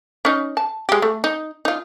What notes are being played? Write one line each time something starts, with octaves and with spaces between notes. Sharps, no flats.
C#4 D#4
A5
G#3 G4
A3
D#4
D#4 F4